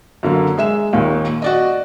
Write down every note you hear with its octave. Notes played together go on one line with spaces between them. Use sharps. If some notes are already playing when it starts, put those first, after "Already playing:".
F#2 D3 A#3
G#3 E5 E7
D#2 A#2 D#3
F#4 D5 D#5